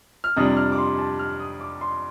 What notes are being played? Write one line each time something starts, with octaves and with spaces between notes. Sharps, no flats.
F6
F2 C3 G3 D4 D#6
F6
D6
C6
A5
F6
D#6
D6
C6